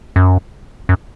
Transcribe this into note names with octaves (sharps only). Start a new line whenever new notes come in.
F#2
F#2